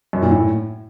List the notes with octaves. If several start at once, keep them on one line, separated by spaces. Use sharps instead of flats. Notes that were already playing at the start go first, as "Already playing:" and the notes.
F#2
A#2
A2